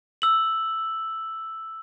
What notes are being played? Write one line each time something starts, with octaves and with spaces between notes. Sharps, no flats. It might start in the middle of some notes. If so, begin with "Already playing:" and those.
E6 F#7